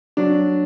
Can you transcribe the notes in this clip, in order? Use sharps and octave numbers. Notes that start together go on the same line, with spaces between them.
F#3 D4